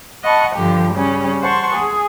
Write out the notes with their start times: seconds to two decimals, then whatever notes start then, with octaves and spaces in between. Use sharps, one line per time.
0.23 D#5 F#5 A5 B5 C#6
0.55 G2 D3 F3 G4
0.93 C#3 G3 C#4
1.41 C5 F#5 A5 C6 C#6
1.74 G#4